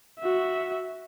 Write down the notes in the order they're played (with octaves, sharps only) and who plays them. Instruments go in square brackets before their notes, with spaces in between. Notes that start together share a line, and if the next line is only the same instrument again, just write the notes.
[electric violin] F#4 E5